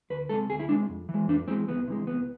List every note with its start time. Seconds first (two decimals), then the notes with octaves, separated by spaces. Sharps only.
0.10 D2 B4
0.29 C3 G#3 A4
0.50 D2 G#4
0.60 E4
0.69 C3 G#3 D4
0.89 F2
1.09 E3 G#3
1.28 F2 D4
1.48 E3 G#3 C4
1.68 C2 B3
1.88 C3 E3 G#3
2.07 C2 B3